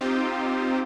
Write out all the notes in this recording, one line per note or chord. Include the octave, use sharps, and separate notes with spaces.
C4 D#4 F4 G4 C5